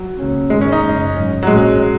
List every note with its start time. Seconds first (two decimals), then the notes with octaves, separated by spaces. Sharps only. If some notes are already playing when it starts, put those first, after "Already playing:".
Already playing: F#3
0.18 C#2 C#3 A#3 C#4
0.50 G#2 D#3 G#3 A#3
0.61 C#4
0.72 D#4
0.83 F#2 C#3 G#3
1.15 G#2 F#3 C#4
1.43 F#3
1.47 A#1 A#2 G#3 A#3 C#4